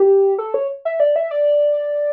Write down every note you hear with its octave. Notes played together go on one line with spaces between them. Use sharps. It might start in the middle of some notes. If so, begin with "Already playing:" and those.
Already playing: G4
A4
C#5
E5
D5
E5
D5